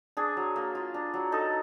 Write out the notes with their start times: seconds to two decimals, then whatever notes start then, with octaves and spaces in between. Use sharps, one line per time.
0.17 D4 G#4
0.37 F#3
0.56 A#3
0.75 F4
0.94 D4
1.14 F#3
1.32 D#4 A4